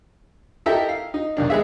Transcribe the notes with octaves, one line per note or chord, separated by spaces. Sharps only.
E4 G4 A4 A#4 D#5 E5
F5
D#4
B1 D#3 D4
G#3 B3 G#4 E5